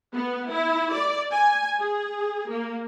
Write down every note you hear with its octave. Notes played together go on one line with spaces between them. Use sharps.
B3
E4
D5
G#5
G#4
A#3